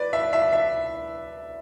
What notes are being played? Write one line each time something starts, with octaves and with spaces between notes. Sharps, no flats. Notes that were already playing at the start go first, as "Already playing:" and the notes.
Already playing: B4 D5
E5
E5
E5